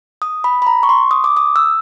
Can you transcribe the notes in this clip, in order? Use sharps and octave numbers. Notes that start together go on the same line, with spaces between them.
D#6
B5
B5
A#5
C#6
C6
D#6
D6
D#6
E6